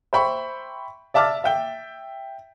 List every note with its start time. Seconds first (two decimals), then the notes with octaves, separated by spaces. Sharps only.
0.13 C5 E5 G5 B5 C#6
1.14 D5 E5 A5 D6 F6 A6
1.44 E5 G5 G7